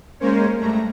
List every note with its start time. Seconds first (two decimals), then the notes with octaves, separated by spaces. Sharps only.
0.20 G#3 A#3 C#4 A#4 C5 C#5
0.58 G2 A3 A#5